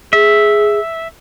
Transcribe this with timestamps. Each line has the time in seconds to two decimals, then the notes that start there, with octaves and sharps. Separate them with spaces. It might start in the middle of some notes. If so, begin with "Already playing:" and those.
0.13 G#4 E5